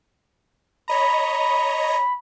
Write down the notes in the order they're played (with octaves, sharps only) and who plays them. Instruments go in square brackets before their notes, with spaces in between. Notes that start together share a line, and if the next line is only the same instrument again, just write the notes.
[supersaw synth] C#5 D#5 A#5 [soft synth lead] B5